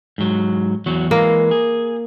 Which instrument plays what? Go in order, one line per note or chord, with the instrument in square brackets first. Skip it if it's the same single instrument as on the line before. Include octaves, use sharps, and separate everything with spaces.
[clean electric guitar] G#2 F#3
E2 F#3 F#4
[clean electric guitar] E3 G#3 [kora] A#3
[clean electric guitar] G#4